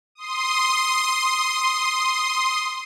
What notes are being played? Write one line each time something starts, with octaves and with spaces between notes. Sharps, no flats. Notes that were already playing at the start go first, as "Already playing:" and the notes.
C6 D#6